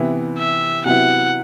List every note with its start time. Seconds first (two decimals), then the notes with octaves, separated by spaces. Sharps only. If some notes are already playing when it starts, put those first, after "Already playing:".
Already playing: C3 E3 B3 E4
0.38 E5
0.85 C3 F#3 B3 E4 F#5